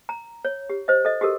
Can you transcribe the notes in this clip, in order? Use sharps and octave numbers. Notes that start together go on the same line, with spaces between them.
A#5
C#5
G4
C5 D#5
A4 D#5
F#4 G4 A4 A#4